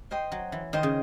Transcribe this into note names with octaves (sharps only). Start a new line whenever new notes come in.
C5 D#5 G5 C6
F#3
E3
D#3 C5 D#5 G5 C6
C#3